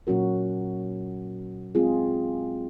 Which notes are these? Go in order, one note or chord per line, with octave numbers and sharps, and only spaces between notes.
A#2 F#3 C#4 F#4 A#4
G#3 C4 F4 G#4